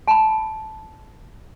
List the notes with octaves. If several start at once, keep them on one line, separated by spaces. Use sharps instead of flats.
A5 B5